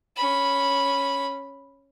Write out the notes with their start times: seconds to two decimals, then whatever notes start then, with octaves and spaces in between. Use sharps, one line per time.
0.16 C#4 B5